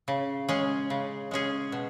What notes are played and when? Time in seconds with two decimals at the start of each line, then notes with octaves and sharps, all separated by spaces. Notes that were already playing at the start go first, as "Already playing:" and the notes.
0.08 C#3
0.49 G#3 C#4 G#4
0.90 C#3
1.31 G#3 C#4 G#4
1.72 B2